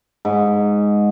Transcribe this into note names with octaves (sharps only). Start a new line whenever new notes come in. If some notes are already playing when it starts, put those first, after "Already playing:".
G#2